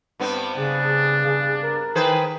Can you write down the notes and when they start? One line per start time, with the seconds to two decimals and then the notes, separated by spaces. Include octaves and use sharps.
0.20 G2 B3 C4
0.57 C#3 D4 G#4
1.25 C#3
1.63 A#4
1.95 D#3 G#4 B4 C5 G5